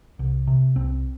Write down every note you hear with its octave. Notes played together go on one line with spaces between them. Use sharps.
C2
C3
C2 C4